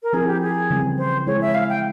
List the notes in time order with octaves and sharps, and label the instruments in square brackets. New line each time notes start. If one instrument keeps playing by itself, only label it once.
[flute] A#4
[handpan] F3 C4 E4 A#4 [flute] G#4
[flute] G4
G#4
[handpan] C#3 E3 G3 C4
[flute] C5
[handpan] G#3 E4 G#4 [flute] C#5
[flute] E5
F5
G5